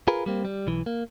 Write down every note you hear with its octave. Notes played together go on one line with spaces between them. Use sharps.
F4 G#4 A#4 B4
G3 A#3 C4
G3
B1 E3
A#3